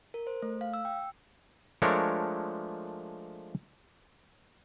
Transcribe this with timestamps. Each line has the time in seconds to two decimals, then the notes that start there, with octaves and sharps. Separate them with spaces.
0.14 A#4
0.27 C5
0.42 A3
0.61 F5
0.74 E6
0.85 G5
1.82 F3 G#3 A3 D4 A#4 C#5